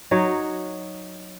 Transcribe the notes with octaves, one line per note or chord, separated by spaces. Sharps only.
F#3 D#4 C#5